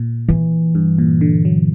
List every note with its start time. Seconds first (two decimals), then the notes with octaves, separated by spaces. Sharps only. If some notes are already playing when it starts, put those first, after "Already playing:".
Already playing: A#2
0.29 E3
0.75 G2
0.98 A#2
1.21 D3
1.45 F#3